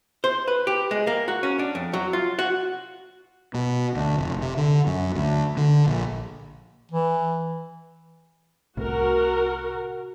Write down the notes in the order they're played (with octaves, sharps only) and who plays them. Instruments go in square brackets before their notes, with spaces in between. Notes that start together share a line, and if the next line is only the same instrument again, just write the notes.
[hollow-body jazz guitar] C5
B4
G4
G#3
A#3
F#4
C#4
D4
F2
F#3
F4
F#4
[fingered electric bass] B2
D2
F1
C3
D3
F#2
D2
D3
A#1
[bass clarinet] E3
[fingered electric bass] C2 A2 [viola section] F#4 A#4